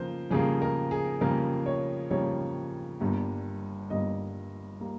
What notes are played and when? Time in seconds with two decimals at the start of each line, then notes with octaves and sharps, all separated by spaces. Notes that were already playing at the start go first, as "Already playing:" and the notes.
Already playing: F2 C#3 A#3 C5
0.31 F2 C#3 G3 A#3 G#4
0.62 A#4
0.91 G#4
1.21 F2 C#3 G3 A#3 A#4
1.66 C#5
2.10 F2 C#3 G3 A#3 C#5
3.00 G1 G2 G3 A#3
3.90 G1 G2 G3 A#3 D#5
4.81 G3 A#3